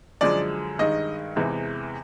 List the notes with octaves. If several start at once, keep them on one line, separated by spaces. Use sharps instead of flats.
F#2 D3 F3 G#3 D5
G2 D#3 G#3 D#5
E2 C3 E3 G#3